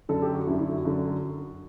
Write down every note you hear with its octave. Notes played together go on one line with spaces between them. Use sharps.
F#2 D3 A4
G4
F#4
F#2 D3 E4
E4
F#4
F#2 D3 F#4